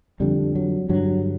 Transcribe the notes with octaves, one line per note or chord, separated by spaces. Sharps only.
F2 D3 G3
F#3
G2 D3 F#3